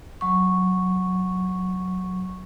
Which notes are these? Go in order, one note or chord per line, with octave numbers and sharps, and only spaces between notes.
F#3 C#6